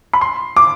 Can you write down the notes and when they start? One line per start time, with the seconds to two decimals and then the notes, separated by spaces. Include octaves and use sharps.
0.13 B5
0.21 C6
0.57 D6